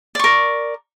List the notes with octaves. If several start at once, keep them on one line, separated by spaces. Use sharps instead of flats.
A#4 D5 C#6